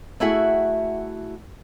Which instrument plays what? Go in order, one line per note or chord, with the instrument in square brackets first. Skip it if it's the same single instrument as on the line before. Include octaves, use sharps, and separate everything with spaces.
[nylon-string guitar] A3 E4 F#4 G#4 E5 F#5